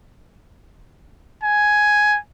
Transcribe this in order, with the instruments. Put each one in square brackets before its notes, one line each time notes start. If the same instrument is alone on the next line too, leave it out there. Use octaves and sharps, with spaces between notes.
[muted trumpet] G#5